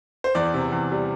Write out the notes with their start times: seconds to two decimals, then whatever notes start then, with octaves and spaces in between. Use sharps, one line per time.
0.24 C5
0.35 E2 D5
0.54 C3
0.72 E2
0.92 G3